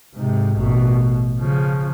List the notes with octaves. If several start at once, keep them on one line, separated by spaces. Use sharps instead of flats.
G#2 C3
A1 B2
C#3 F3